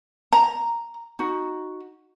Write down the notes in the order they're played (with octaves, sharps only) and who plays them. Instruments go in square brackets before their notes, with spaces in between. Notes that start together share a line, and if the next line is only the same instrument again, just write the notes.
[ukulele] A#5
D#4 F#4